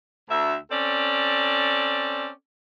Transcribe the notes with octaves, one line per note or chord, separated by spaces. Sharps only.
D2 E5
C4 C#4 A4 D5